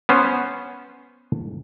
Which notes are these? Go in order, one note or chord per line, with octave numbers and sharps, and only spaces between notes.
B3 C#4 C5